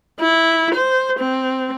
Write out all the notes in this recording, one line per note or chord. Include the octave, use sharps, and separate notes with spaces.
E4
C5
C4